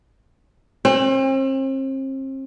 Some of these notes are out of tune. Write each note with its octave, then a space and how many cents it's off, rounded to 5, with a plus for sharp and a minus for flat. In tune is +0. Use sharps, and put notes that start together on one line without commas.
C4 +40